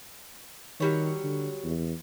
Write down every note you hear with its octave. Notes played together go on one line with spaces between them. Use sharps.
D#3 F#3 G3 C#5
D3
E2